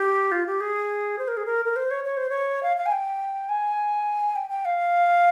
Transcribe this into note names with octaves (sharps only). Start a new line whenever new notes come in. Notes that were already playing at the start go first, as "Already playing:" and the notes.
Already playing: G4
F4
G4
G#4
C5
A#4
G#4
A#4
A#4
C5
C#5
C#5
C5
C#5
F5
F5
G#5
G5
G#5
G5
G5
F5